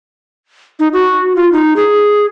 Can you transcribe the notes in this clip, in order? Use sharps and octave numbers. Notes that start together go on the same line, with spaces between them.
D#4
F#4
F4
D#4
G#4